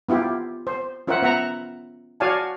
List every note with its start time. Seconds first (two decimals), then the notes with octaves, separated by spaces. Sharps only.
0.09 B3 E4 F4 G4
0.67 C5
1.07 C#4 F4 A#4 C5 E5 F#5
1.22 B3 E5 F#5 A#5
2.20 F#4 C#5 D5 F5 G#5 A5